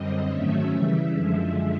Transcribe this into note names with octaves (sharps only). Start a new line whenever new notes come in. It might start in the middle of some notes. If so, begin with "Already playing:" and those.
Already playing: F#2 D3 G3 C4 D#5
G#2 D#3 F#3 A3 C#4 E5
C#3 E3 G3
F#2 D3 F3 G#3